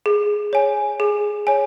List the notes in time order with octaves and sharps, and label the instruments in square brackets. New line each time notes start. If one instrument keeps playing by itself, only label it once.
[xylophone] G#4
C#5 G#5
G#4
C#5 G#5